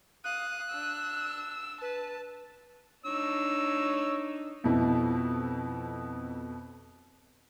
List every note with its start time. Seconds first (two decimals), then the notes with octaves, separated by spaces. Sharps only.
0.24 F5 D#6 F#6
0.70 D4 E6
1.82 B4 A5
3.06 D4 D#4 C#5 E6
4.64 F2 B2 E4